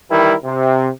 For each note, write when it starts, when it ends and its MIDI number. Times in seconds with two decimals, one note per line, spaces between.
0.10 0.33 51
0.10 0.33 52
0.10 0.33 55
0.10 0.33 64
0.10 0.33 70
0.44 0.89 48